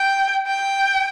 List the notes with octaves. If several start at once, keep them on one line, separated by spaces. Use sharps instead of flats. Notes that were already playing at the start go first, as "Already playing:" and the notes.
Already playing: G5
G5